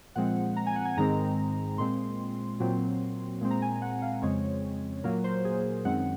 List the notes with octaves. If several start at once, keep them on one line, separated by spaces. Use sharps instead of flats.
A#2 F3 G#3 C4 F#5
A#5
G#5
F#5
G#5
G#2 D#3 G#3 C4 A#5
A#2 G#3 C4 C6
A#2 F#3 C4
A#2 G#3 C4
A#5
G#5
F#5
F5
F2 C#3 G#3 C4 C#5
A#2 F#3 A#3 A#4
C5
G#4
F#2 D#3 G#3 C4 F#5